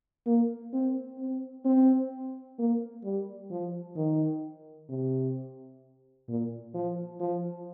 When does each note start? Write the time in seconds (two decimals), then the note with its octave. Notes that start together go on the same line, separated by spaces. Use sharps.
0.26 A#3
0.73 C4
1.19 C4
1.65 C4
2.58 A#3
3.04 G3
3.51 F3
3.96 D#3
4.89 C3
6.28 A#2
6.74 F3
7.20 F3